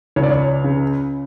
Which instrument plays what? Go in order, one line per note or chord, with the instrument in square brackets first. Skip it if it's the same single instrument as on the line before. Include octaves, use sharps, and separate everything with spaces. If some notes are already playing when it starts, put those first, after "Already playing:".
[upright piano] C#2 C#5
D5
C#5
C#3